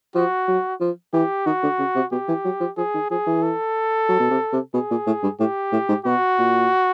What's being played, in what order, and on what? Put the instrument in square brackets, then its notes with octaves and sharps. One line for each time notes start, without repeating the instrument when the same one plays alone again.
[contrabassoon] F3 [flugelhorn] F#4
[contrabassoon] F#3
F3
[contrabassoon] E3 [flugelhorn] G4
[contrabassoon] D#3 [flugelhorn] F#4
[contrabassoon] D3
C#3
C3
[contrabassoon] B2 [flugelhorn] G4
[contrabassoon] E3
F#3
F3
[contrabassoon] F3 [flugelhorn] G#4
[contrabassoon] D#3
[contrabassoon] F3 [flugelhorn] G#4
[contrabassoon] E3
[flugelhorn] A4
[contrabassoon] F#3
B2
C3
C3
[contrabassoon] B2 [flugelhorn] G#4
[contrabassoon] A#2
A2
G2
[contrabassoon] A2 [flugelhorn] G4
[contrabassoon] A2
G#2
[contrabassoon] B2 [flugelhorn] F#4
[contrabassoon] A#2